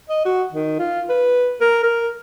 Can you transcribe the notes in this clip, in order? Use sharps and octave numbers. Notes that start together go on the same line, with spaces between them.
D#5
F#4
D#3
F4
B4
A#4
A#4